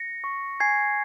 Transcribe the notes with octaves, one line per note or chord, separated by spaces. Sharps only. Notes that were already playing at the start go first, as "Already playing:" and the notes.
Already playing: A#6 C#7
C#6
G#5 G#6 C7